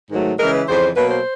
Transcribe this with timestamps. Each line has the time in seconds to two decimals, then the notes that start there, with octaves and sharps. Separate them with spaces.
0.10 G#2 D#3 F#3 A3
0.39 C#3 E3 G#3 A#4
0.54 B4
0.68 F2 C#3 E3 C5
0.96 B2 F#3 A#3 B4
1.11 C5